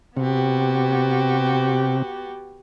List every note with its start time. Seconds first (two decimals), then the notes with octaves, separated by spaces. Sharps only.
0.17 C3 B3 F#4 G4